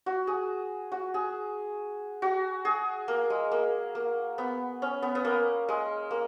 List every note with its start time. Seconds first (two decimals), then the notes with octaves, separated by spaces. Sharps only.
0.06 F#4
0.27 G#4
0.92 F#4
1.14 G#4
2.22 F#4
2.65 G#4
3.08 A#3
3.30 G#3
3.52 A#3
3.95 A#3
4.38 B3
4.82 C#4
5.02 B3
5.15 B3
5.25 A#3
5.69 G#3
6.11 A#3